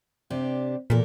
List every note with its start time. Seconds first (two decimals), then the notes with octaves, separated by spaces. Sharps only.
0.30 C3 D4 G4
0.90 E2 A#2 A4 A#4